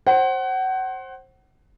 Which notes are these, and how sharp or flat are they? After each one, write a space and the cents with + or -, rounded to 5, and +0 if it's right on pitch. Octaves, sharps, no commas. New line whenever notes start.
C5 +25 F#5 +30